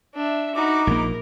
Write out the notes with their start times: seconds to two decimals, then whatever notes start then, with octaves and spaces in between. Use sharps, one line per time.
0.14 D4 E5
0.55 D#4 F#4 B5 D6
0.87 A#1 A#3 A#4